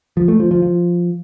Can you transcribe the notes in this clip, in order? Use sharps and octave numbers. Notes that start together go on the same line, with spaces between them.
F3
A3
F3
F3
F3